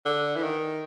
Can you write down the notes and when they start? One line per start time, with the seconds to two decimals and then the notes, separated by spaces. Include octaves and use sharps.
0.05 D3
0.36 E3
0.43 D#3